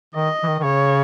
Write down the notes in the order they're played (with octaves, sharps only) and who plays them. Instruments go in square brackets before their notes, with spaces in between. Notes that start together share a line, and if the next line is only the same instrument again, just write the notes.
[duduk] D#3 [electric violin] D#5
[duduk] E3
D#3
D#3
[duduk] C#3 [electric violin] C#5